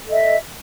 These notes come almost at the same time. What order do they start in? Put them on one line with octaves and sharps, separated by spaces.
A4 D#5 E5